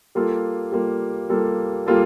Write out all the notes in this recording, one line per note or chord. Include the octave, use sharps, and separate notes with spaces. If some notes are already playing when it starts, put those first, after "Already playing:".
G3 A#3 F4 A4
G3 A#3 F4 A4
G3 A#3 F4 A4
G3 A#3 F4 A4